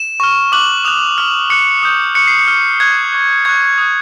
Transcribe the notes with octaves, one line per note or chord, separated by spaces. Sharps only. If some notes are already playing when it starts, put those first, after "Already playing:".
Already playing: E7
C#6 F6
D6 F#6 F#7
D#6 F#6 F7
D6 F6
D6 F#6 C#7
D#6 G6
C#6 F#6 C#7
C7
C#7
C#6 F6
C#6 F#6 G#6
C#6 F#6
C#6 F#6 G#6
D#6 F#6